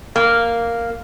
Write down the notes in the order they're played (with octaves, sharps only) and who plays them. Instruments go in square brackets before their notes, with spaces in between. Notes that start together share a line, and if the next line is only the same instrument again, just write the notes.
[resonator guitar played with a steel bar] A#3